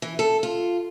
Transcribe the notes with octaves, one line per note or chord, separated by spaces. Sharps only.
E3
A4
F4